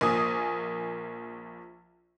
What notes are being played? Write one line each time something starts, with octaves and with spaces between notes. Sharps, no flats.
A#1 A#3 G#5 D#6